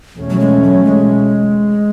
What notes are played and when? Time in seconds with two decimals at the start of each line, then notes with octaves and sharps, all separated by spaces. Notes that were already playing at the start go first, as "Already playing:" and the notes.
0.16 E2 B2 A3 C#4
0.30 F#3
0.40 G#3
0.63 F#3
0.85 G#3